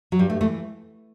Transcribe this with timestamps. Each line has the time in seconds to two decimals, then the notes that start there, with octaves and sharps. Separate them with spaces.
0.12 F#3
0.19 G2 G3
0.30 A3
0.41 E3 A3